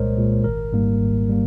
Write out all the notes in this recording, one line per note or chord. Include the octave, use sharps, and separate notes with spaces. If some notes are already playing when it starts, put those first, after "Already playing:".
Already playing: C2 A#2 G#3 A#4 C5 C#5 D#5
A#2 G#3
G#1 A#4
G#2 G3 A#3
G#1
G3 A#3